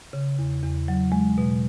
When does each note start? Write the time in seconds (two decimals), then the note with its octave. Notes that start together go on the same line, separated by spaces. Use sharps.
0.13 C#3
0.39 E2
0.63 E2
0.88 F#3
1.12 G#3
1.38 B2